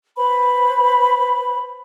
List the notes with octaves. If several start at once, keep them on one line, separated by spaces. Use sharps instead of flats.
B4 C5 B5